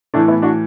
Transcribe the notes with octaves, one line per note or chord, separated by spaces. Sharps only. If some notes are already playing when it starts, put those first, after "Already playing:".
A2 E3 A3 D4
B3 E4
D4 F#4